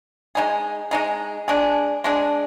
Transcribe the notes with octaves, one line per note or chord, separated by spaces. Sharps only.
G#3 D#4 G#4
G#3 D#4 G#4
G#3 D4 G#4
G#3 D4 G#4